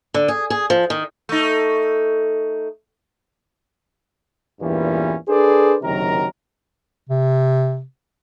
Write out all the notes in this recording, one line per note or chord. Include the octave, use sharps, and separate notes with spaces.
D3
G#4
G#4
F3
D#3
A3 D#4
E2 G2 A#2 E3 G3 C#4
D4 G#4 A4 B4 C5 D5
F#1 C3 D#3 F#3 A#4 A#5
C3